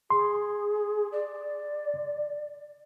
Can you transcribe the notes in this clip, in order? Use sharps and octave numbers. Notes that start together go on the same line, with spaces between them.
G#4 C6
D5